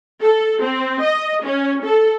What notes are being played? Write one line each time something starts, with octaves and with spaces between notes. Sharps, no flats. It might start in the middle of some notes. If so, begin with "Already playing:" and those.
A4
C4
D#5
C#4
A4